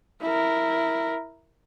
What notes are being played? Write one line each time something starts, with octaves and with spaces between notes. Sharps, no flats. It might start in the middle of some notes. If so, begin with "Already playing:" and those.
E4 A#4